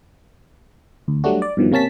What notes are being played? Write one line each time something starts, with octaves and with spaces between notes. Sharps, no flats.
D2
F#3 G3 A3 D4 F#4
D5
G2 B2 D#3 F3
C3 A#3 C#4 A5 B6